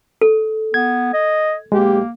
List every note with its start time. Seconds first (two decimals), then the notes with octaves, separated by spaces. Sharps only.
0.21 A4
0.74 B3 G#6
1.13 D#5
1.72 B1 G#3 A#3 G4